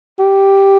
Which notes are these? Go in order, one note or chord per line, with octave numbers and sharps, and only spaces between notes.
G4